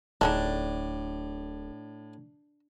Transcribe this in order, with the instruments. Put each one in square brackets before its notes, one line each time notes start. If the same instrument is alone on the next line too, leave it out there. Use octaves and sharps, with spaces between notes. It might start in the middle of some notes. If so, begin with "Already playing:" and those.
[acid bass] D1 [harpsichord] A2 [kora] D4 [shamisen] D#4 G#4 A4